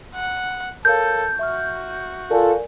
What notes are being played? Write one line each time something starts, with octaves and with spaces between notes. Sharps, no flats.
F#5
A4 A#4 C#5 F5 G6
F#4 E5 C#6 F6
F4 A4 A#4 D5 G#5